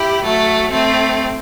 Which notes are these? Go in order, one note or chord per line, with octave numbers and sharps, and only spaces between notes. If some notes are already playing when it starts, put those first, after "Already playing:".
Already playing: E4 G4
F#3 A3
A3 C4